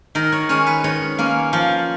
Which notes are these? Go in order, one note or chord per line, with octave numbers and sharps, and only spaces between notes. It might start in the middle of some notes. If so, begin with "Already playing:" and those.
D#3 A#4
C#5
G#3 C#4 C#5
B4
D#3 C#5
A#3 C#4
F3